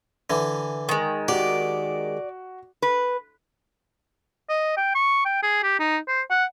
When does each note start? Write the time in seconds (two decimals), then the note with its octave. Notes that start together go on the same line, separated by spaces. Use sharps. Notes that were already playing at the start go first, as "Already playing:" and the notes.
0.30 D3 E3
0.89 D#3 G#3
1.28 F#4 G4 D5
2.82 B4
4.49 D#5
4.77 G5
4.95 C#6
5.25 G5
5.43 G#4
5.63 G4
5.80 D#4
6.08 C5
6.30 F#5